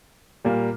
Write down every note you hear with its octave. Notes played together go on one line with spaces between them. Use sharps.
A#2 G3 A#3